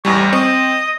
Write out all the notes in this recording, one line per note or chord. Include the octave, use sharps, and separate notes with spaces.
A1 E2 G3 C#6
C4 D#5